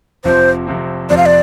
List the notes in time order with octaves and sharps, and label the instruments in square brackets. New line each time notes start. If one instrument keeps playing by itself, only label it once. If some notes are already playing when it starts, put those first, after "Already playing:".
[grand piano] F1 F2 C3 F3 C4 [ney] C5
[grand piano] F1 F2 C3 F3 C4
[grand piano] F1 F2 C3 F3 C4 [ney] D5
[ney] F5
D5